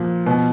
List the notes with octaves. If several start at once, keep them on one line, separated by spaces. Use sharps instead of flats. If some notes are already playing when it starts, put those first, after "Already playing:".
Already playing: A#2 F3
B2